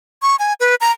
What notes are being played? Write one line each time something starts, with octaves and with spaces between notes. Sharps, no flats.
C#6
G#5
B4
A#5